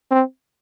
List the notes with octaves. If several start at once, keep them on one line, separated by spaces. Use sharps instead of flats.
C4